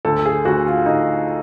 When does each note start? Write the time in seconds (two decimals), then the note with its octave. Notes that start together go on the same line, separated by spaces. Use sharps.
0.05 D2 A4
0.19 A4
0.26 G#4
0.45 D2 F#4
0.67 F4
0.86 D2 D#4